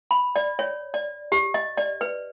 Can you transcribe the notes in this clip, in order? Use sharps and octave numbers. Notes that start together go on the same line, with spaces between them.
B5
D5
C#5
D5
G4
D#5
D5
B4